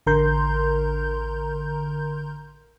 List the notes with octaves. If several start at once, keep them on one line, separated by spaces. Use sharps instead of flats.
A1 D3 A#4 A#5 C6 G6